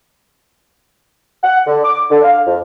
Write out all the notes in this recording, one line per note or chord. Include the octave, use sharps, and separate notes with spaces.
F#5
D3
D6
D3
F5
F2